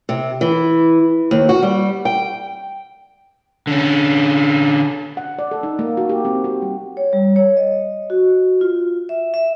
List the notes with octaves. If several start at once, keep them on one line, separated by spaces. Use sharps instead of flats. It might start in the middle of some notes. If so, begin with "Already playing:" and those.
C3
E3
D#2
F#4
G3
G5
D3 C#4
F#5
D5
A4
D#4
A#3
F#4
G4
C4
F#4
G3
C#5
G3
C#5
D#5
F#4
F4
E5
E5